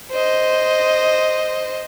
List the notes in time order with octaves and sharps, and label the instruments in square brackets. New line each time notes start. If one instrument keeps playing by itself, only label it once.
[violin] C5 D#5